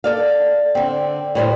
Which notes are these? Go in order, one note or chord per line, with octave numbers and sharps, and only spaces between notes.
A4 D5 F5
D3 C4
A2 G3 C5